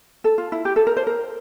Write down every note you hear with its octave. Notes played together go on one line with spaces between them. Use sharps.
A4
F4
E4
G4
A4
A#4
C5
A#4